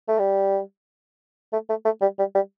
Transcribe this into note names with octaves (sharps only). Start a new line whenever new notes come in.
A3
G3
A3
A3
A3
G3
G3
G3